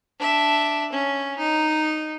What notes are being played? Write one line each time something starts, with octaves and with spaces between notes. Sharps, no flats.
D4 E5
C#4
D#4